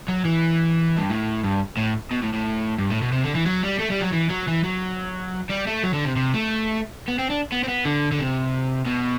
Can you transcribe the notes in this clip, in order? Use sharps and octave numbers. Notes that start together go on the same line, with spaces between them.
F#3
E3
G2
A2
G2
A2
B2
A2
A2
G2
A2
B2
C3
D3
E3
F#3
G3
A3
G3
F#3
E3
F#3
E3
F#3
G3
A3
F#3
D3
C3
C3
A3
B3
C4
D4
B3
C4
B3
D3
D3
C3
B2